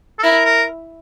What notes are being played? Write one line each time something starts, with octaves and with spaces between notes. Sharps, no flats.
A4
E4 A#4
A#4